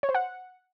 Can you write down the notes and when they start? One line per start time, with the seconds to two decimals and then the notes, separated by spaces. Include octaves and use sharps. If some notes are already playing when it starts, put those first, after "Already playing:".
0.03 C#5
0.09 C5
0.15 F#5